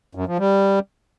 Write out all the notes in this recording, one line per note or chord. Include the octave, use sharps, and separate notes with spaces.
F#2
F3
G3